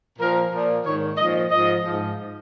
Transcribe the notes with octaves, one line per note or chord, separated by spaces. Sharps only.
A#2 F3 A#4
A#2 F3
G#2 D#3 C#5
A#2 F3 D#5
G#2 F3 D#5
G#2 F3